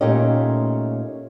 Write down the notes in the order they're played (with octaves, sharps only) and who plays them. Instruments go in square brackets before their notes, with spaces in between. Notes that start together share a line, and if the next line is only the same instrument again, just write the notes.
[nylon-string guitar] A#2 A3 C#4 D#4 G4 D#5